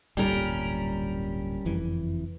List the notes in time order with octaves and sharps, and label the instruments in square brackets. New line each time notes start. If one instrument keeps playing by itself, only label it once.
[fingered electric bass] D1 G1 A#2 [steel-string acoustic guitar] G3 C#4 A#4
[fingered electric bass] F#1 F2 E3